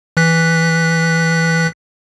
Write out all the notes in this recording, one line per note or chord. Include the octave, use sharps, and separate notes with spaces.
E3 F#6 B6